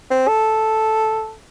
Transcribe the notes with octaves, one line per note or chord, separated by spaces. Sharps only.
C4
A4